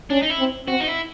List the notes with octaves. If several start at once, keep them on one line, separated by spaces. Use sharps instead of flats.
C#4 D4
D#4
E4
C4
C4 F#4
D#4
E4